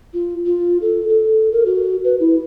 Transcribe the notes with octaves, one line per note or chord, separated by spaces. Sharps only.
F4
F4
A4
A4
A#4
F#4
B4
E4